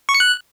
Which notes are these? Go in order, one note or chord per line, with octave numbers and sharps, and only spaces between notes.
C#6
C#7
F#6